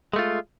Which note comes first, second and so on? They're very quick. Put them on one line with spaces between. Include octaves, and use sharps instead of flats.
G#3 A3 F4